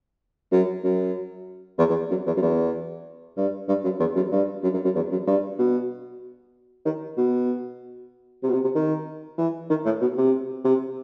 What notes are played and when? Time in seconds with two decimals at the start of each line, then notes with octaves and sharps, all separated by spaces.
0.52 F#2
0.84 F#2
1.78 E2
1.89 E2
2.10 F#2
2.26 E2
2.37 F#2
2.42 E2
3.37 G2
3.68 G2
3.84 F#2
4.00 E2
4.16 F#2
4.32 G2
4.63 F#2
4.74 F#2
4.84 F#2
4.95 E2
5.11 F#2
5.27 G2
5.58 B2
6.85 D#3
7.17 B2
8.43 C3
8.49 B2
8.54 C3
8.64 C3
8.75 D#3
9.38 E3
9.70 D#3
9.85 A2
10.01 B2
10.17 C3
10.64 C3